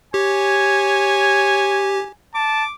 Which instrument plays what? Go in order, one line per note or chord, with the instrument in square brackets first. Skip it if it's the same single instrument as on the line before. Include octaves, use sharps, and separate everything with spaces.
[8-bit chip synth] G4 [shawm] C#5 [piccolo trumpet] G#5
[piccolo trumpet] A5 [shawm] D6